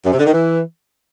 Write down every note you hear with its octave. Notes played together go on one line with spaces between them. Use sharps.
F#2
C3
D3
D#3
E3